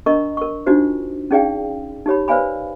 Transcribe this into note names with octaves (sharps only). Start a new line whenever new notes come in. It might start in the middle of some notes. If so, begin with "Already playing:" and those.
D4 A#4 D#5 A#5 C#6
A#4 C#6
D4 D#4 F4 F#4 C5
C#4 D#4 G#4 D5 F5 G5
D#4 G4 C#5 B5
B4 C5 D5 F5 G#5 B5